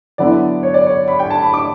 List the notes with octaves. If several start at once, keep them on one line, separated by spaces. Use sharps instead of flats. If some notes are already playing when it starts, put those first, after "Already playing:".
D3 F#3 B3 E4 D5
C#5
D5
C#5
B5
G5
A5
B5
D6